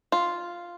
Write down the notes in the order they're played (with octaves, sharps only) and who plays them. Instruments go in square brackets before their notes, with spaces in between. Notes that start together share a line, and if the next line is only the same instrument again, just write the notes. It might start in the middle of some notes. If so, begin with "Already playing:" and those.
[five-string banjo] F4